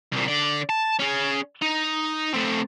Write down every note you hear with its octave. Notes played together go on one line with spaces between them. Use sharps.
C2 A#2
D3 D5
A5
C#4 G#4
D#4
A3 C4